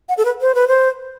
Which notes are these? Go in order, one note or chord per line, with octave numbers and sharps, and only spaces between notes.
F#5
A4
B4
C5
B4
C5